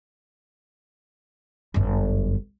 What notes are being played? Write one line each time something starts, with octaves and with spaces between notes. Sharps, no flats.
G1 F#2